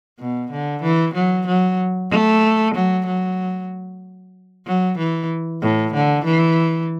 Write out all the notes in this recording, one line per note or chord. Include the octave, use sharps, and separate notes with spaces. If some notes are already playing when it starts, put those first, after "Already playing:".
B2
D3
E3
F#3
F#3
A3
F#3
F#3
F#3
E3
A2
D3
E3